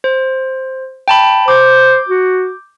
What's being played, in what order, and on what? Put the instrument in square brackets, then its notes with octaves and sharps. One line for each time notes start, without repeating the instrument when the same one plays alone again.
[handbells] C5
G5 A5 B5
[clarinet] C5 [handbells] D6 G6
[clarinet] F#4